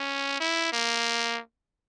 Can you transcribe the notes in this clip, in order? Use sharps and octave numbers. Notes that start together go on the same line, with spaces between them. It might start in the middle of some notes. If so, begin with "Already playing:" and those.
Already playing: C#4
E4
A#3